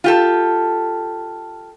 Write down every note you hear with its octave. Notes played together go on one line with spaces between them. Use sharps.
F4 G4 A4